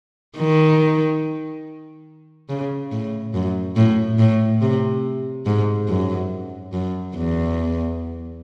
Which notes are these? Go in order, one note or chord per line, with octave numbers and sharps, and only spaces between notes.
D#3
C#3
A2
F#2
A2
A2
C3
G#2
F#2
F#2
E2